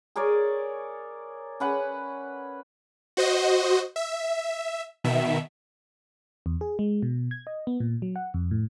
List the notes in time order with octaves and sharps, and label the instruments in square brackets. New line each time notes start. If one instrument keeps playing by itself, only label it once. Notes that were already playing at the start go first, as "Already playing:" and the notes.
[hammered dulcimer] G#4 A#4 C#5 D5
C#4 B4 F#5
[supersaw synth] F#4 C5 D#5
E5
B2 D#3 E5
[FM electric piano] E2
G#4
G#3
B2
G#6
D#5
B3
A#2
F#3
F#5
F2
A2